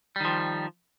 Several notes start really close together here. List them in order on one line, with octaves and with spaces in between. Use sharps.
G3 D#3 F3